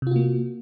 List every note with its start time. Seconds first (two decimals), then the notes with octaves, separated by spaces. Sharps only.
0.02 C3
0.07 F4
0.11 F#4
0.16 A#3